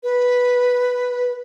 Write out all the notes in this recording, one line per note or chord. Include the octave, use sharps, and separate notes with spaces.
B4